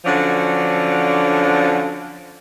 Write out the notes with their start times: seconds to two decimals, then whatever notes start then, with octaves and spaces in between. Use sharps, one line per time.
0.05 D3 F3 F#3 C#4 D4